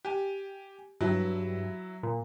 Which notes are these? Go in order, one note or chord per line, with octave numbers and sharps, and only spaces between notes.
G4 G#5
G2 F#3 E4
A#2